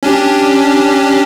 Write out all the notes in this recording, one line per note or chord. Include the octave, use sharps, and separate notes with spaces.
C#4 D4 G4